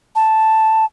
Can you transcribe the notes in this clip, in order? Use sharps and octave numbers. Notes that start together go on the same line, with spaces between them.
A5